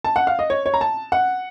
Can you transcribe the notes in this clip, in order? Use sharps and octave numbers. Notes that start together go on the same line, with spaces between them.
A5
F#5
F5
D#5
C#5
C#5
A#5
A5
F#5